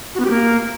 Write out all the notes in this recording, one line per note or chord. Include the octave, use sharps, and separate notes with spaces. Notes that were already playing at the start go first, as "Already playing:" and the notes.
F#4
B3
G4
A#3